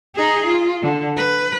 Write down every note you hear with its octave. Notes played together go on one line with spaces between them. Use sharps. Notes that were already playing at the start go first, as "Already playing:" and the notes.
D#4 G#4
F4
D3
B4